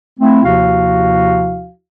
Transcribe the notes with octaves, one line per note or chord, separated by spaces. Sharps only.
A3 C4 E4
D#2 C3 F3 E4 F#4 F5